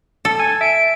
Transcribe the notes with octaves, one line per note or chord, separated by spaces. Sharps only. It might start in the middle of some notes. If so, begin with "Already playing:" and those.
A4
G#5
E5 D7